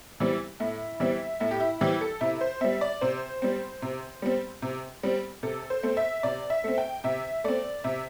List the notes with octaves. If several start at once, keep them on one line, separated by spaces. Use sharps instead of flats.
E3 G3 C4
A2 E4
E3 G3 C4 E5
A2 E4
G4
E4
E3 G3 C4 G4
A4
C3 E4
C5
G3 C4 E5
D5
C3 C5
G3 C4
C3
G3 C4
C3
G3 C4
C3 A4
C5
A3 C4
E5
C3 D5
E5
A3 C4
G5
C3 E5
A3 C4 D5
C3 E5